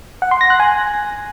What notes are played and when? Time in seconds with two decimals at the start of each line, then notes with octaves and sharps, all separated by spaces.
0.22 F#5
0.31 C6
0.41 A#6
0.50 F#6
0.60 G#5